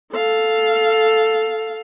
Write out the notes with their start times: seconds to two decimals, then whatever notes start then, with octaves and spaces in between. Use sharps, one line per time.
0.12 A4 F5